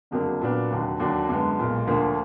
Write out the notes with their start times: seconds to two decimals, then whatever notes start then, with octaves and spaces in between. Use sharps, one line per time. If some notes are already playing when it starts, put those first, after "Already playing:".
0.11 F#1 F2 D3 F#3 A#3
0.41 A#2 F#3 B3 D4
0.70 F1 D#2 D3 F#3
0.99 D#2 D3 F#3 D4
1.28 F#2 D3 G#3 B3
1.58 B1 A#2 G#3
1.87 D2 D3 F3 A#3